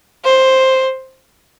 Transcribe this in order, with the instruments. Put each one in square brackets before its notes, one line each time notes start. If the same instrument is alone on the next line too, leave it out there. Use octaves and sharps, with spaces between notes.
[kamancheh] C5